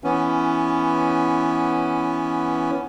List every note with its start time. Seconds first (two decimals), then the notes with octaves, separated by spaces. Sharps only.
0.04 E3 B3 C#4